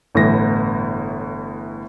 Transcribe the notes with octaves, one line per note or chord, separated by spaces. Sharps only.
G1 A2 E3 A#6